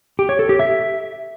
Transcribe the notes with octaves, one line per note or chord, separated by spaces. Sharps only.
G4
C#5
A4
G4
E5